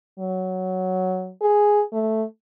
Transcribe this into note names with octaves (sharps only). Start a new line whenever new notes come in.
F#3
G#4
A3